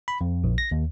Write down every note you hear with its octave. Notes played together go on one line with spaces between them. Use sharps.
B5
F2
A#1
A#6
D#2